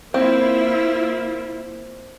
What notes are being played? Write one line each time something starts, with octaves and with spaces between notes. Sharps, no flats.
A#3 C4 E4 F4